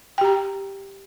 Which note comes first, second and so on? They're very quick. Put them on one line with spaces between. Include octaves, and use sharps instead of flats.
G5 G4 A#5